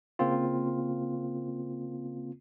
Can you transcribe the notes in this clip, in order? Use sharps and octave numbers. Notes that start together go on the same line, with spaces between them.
C#3 A#3 C4 F4